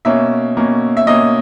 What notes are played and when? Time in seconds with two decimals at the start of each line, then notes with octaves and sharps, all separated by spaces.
0.05 B2 A#3 C#4 E5
0.57 B2 A#3 C#4
0.97 E5
1.07 B2 A#3 C#4 D#5